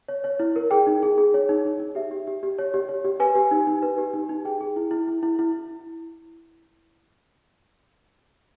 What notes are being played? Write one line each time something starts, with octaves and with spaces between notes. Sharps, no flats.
C#5
C#5
E4
A#4
G#4 G5
D#4
G#4
G#4
C#5
D#4
D#4
D#4
G4 E5
G4
G4
G4
C#5
G4
C#5
G4
B4 G#5
G4
D#4
D#4
B4
G4
D#4
D#4
G#4 G5
G#4
E4
E4
E4
E4
E4